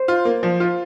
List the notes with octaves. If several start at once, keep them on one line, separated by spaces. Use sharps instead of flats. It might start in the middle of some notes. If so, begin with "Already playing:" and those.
Already playing: C5
F4
A#3
F3
F4